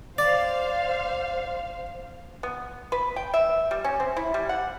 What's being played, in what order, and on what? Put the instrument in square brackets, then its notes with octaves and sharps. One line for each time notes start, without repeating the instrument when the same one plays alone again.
[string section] C5 F5 [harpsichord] D5
[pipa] B3
B4
G5
E5
G3
C#4
C4
E4
G3
F#5